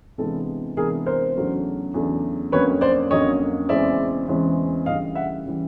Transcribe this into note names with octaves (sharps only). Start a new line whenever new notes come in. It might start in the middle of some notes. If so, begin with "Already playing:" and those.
C3 E3 G#3 B3 D4 A4
C3 E3 G#3 B3 D4 G#4 A#4
A#4 C5
E2 C#3 F#3 A3 D4
E2 C#3 F#3 A3 D4
F2 D3 F#3 A#3 C#4 B4 C#5
C5 D5
F2 D3 F#3 A#3 C#4 C#5 D#5
E2 C#3 E3 G#3 C4 D5 E5
E2 C#3 E3 G#3 C4
D2 C#3 E3 G3 D#5 F5
E5 F#5
C#3 E3 G3